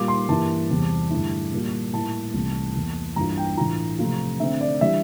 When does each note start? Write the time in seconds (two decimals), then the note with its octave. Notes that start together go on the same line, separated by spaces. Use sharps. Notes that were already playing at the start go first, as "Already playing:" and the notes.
Already playing: A#2 G3 A#3 F4 D6
0.08 C6
0.28 G2 E3 G3 A#3 E4 A5
0.70 E2 C3 E3 G3 C4
1.10 G2 D3 A3 E4
1.52 A#2 G3 A#3 F4
1.93 A2 G3 A#3 E4 A5
2.34 C2 C3 E3 A3
2.75 E2 E3 A#3
3.16 G2 E3 A#3 D4 F4 A#5
3.37 G5
3.57 A2 E3 A3 D4 F4 A#5
3.99 C3 F3 A3 C4 F4
4.40 D3 A3 C4 E5
4.61 D5
4.81 E3 G3 D4 E5